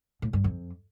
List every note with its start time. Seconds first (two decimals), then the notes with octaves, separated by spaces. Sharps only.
0.22 A2
0.33 G2
0.44 F2